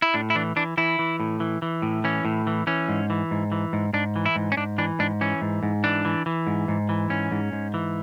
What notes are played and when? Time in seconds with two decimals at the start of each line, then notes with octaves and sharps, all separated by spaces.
0.02 E4
0.14 A2 D4
0.30 E4
0.35 E3 D4
0.56 E3 D4
0.77 E3 E4
0.99 E3
1.20 A2
1.40 E3
1.62 E3
1.82 A2
2.04 E3 C#4
2.25 A2
2.47 E3
2.67 E3 C#4
2.89 G#2
3.10 E3
3.31 G#2
3.52 E3
3.73 G#2
3.93 G#2 D4
4.16 E3
4.26 E4
4.36 G#2
4.52 C#4
4.57 G#2 D4
4.78 E3 D4
4.99 G#2 D4
5.21 E3 C#4
5.42 G#2
5.63 G#2
5.84 E3 D4
6.05 E3
6.26 E3
6.47 G#2
6.68 G#2
6.89 E3
7.10 G#2 C#4
7.32 G#2
7.53 G#2
7.74 E3